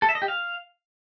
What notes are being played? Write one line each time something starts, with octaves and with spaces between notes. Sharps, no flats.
A4
E5
D#5
G4
F5